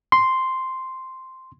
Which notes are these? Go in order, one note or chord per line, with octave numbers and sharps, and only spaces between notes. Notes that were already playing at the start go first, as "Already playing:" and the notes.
C6